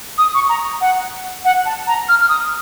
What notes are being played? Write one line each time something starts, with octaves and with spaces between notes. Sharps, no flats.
D#6
C#6
A#5
F#5
F#5
A5
A#5
F6
F6
D#6